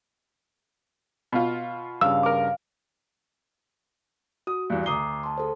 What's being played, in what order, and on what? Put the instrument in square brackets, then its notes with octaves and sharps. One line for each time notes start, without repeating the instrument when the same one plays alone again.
[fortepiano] B2 F4
[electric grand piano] G2 C#3 [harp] F5 [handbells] E6
[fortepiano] A#4 D6
[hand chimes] F#4 [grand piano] D#6
[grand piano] E2 G2
[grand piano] D2 D#6 G7 [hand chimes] A#5 D6 C7
[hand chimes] A5 C6
G#4 A4 C5